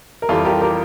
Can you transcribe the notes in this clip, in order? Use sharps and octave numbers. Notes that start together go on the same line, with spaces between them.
A#4
F2 E3 G3 F4 A4
G4 A#4
G4 A#4